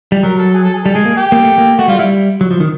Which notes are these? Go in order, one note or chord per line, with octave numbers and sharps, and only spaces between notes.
G3
F#3 A#4
A4
G#4
A4
G#4
G3 A4
G#3 G#4
A#3
G4
A#3
A3
A#3
A3 F#4
G3 F4
G3 E4
F#3
F3
D#3